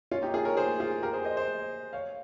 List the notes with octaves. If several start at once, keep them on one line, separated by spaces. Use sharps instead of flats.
C#4 F4
D#4 G4
F4 G#4
A#4 C#5
G#4 C5
F4 G#4
G4 A#4
G#4 C5
C5 D#5
C5 D#5
C#5 F5